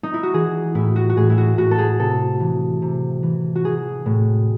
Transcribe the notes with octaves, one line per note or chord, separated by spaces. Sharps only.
D#4
E4
F#4
E3 G#4
A2 E4
F#4
F#4
A2 G#4
E4
F#4
A2 F#4
A4
G#4
C3 A4
E3
C3
E3
F#4
E3 G#4
A2